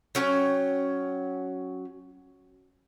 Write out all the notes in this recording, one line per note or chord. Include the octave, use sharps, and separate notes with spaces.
F#3 C#4 G5